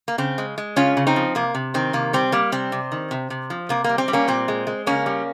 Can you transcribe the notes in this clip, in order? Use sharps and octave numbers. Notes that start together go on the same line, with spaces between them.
A#3
C#3 C4
G#3
G#3
C#3 C#4 F4
C#3
C4 D#4
F3
C3 A#3
C3
D#3 C4
C3 A#3
G3 C4
G3 A#3
C3 C4
C3
D#3
C3
C3
F3
C3 A#3
G3 A#3
C4
G3
A#3 C#4
A#2 C4
G#3
G#3
C#3 A#3 C#4
G3